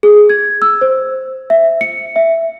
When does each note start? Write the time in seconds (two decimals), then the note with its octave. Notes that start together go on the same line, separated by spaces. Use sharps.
0.03 G#4
0.30 G#6
0.62 E6
0.81 C5
1.50 E5
1.81 C#7
2.16 E5